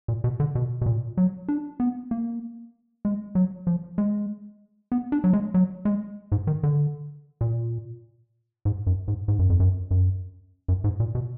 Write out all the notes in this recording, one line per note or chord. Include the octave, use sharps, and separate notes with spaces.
A#2
B2
D3
B2
B2
A#2
F#3
D4
B3
A#3
G#3
F#3
F3
G#3
B3
D4
F#3
G#3
F#3
G#3
G#2
D#3
D3
A#2
G#2
F#2
G#2
G#2
F#2
F2
F#2
F#2
F#2
G#2
A#2
B2